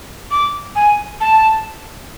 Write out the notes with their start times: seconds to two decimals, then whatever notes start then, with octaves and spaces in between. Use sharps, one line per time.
0.31 D6
0.76 G#5
1.21 A5